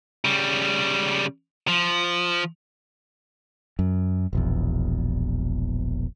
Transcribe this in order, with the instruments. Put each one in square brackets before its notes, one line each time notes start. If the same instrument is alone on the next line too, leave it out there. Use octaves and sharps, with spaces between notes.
[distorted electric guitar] C#3 G3
F3
[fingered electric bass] F#2
E1 A#1 E2